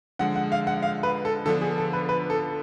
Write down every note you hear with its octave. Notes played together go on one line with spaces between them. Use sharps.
D3 F3 G#3 F#5
F#5
F5
F#5
F5
B4
A4
D3 F3 B3 D4 A4
G#4
A4
B4
B4
A4